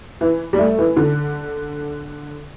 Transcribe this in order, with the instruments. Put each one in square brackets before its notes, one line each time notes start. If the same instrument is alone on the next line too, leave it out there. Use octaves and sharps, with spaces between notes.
[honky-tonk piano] E3
G3
A3
E3
D3